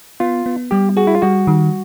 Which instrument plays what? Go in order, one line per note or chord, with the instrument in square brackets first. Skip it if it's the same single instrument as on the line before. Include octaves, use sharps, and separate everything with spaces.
[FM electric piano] B3 [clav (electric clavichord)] F4
[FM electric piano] B3
[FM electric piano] G3 [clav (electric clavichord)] G4
[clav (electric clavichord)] F#4 [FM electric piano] G#4
[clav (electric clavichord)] E4
F4
[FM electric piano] G3 [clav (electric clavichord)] F#4
[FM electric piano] D#3